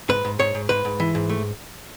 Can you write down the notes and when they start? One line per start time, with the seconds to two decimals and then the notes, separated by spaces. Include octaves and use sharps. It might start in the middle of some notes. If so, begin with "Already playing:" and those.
0.09 G#2 B4
0.25 G#2
0.39 G#2 C#5
0.55 G#2
0.69 G#2 B4
0.85 G#2
1.00 E3
1.15 G#2
1.29 A3